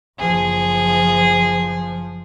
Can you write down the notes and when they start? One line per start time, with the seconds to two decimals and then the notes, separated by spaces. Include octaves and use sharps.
0.20 F#1 F3 G#4